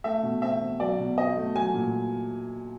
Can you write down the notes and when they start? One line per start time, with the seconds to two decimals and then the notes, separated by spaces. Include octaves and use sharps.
0.04 A3 E5
0.23 B2
0.42 C4 E5
0.61 C4
0.80 F#3 D5
0.99 B2
1.17 C4 D#5
1.37 A3
1.55 F#3 G#5
1.74 A#2